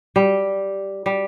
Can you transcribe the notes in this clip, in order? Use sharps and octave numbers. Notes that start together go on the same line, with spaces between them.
G3
G3